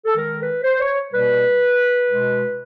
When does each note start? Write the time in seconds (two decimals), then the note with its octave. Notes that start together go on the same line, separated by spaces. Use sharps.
0.06 A4
0.15 D#3 G#3 A#4
0.39 B4
0.64 C5
0.80 C#5
1.12 B2 G3 A#3 B4
2.09 B2 G#3